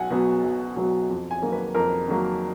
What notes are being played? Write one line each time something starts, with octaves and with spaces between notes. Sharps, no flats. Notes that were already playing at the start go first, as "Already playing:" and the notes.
Already playing: B1 F#5 G#5
B2 F#3 B3
B1
B2 F#3 B3
F2
G#5
D#3 F#3 A#3
B4
F2 A#4
D#3 F#3 A#3